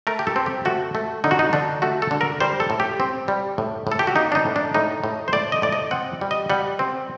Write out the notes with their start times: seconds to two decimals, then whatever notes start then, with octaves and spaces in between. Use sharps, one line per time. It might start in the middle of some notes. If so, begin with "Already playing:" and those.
0.07 A3 A#4
0.19 G4
0.27 A4
0.36 C4
0.46 G4
0.65 A3 F#4
0.95 A3
1.24 D3 D#4
1.31 F#4
1.39 D#4
1.53 D3 D4
1.82 A3 F#4
2.02 A4
2.11 D3
2.21 A#4
2.40 G3 C5
2.60 A4
2.70 A2
2.80 G4
3.00 C4
3.28 G3
3.58 A2
3.87 A2 A4
3.99 G4
4.07 F#4
4.16 A#3 D#4
4.32 D4
4.35 D#4
4.46 A2
4.56 D4
4.74 A2 D#4
5.04 A2
5.28 C5
5.33 A2 D5
5.52 D#5
5.62 A2 D5
5.72 D#5
5.91 C4 F#5
6.21 G3
6.31 D#5
6.50 G3 F#5
6.79 C4